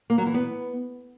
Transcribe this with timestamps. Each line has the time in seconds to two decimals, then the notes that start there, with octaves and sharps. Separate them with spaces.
0.10 A#3
0.18 F#3
0.26 E3
0.34 B3